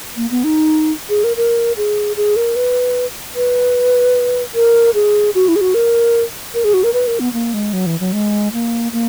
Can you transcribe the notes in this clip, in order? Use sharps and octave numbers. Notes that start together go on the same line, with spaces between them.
A#3
B3
D#4
G#4
A#4
A#4
G#4
G#4
A#4
B4
B4
A#4
G#4
F#4
E4
G#4
F#4
A#4
A#4
G#4
F#4
A#4
B4
A#4
B3
A#3
G#3
F#3
E3
F#3
G#3
A#3
A#3